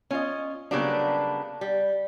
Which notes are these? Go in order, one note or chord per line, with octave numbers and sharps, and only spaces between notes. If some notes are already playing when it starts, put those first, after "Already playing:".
C#4 F4 D#5
C#3 F#3 G3 A#3 B3 D4
G3